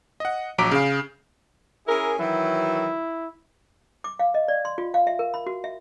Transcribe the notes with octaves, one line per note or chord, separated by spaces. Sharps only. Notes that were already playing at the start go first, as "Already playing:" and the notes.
D#5 F#5
A#1 F#3 A#5 D6 B6 D7
C#3 G#4 F5
C#4 E4 G#4 A#4
D#3 E3 F#3 E4
D6
F5
D#5
D5
C6
F4
F5
E5
A#4
B5
F#4
E5